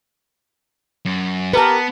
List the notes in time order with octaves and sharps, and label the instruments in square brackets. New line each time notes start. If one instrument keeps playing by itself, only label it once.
[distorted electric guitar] F#2
[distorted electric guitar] B3 [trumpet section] G4 A#4 [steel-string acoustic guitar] B4 A5